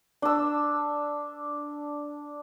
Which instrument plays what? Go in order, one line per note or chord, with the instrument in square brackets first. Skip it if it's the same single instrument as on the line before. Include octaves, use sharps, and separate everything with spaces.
[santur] D4 E6